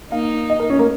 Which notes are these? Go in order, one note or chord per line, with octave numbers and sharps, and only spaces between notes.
A#3 D#4 F5
D#5
A#4
C#4
A#3